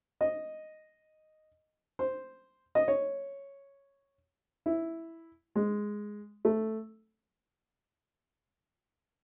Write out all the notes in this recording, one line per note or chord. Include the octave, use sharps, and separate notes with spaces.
D#5
C5
D#5
C#5
E4
G#3
A3